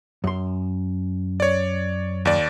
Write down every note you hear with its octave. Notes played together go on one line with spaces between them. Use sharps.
F#2 C6
C#5 D5
D#2 D5